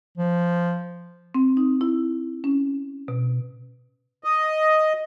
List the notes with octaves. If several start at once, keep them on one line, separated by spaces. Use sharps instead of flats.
F3
C4
D#4
E4
C#4
B2
D#5